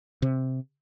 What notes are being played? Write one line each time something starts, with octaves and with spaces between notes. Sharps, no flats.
C3